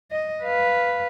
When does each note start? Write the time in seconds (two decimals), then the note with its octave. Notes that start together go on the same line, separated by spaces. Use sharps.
0.11 D#5
0.44 B4 F5